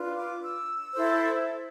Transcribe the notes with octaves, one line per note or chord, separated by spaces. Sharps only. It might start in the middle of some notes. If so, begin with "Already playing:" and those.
Already playing: D4 F4 B4
D6
E6
E4 A4 C5